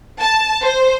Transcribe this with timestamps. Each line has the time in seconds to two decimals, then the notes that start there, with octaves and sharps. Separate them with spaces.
0.20 A5
0.63 C5